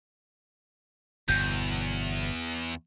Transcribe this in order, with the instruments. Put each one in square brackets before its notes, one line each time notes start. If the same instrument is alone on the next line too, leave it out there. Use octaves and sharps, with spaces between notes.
[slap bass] G1 B2 [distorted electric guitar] E2 [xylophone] G6